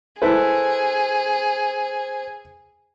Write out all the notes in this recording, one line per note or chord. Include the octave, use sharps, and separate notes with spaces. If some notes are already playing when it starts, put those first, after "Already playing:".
E4 G#4 A4 B4 C5